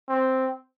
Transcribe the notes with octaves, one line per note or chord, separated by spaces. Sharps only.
C4